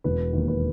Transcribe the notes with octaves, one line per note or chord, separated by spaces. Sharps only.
E1 B4
D#2
B4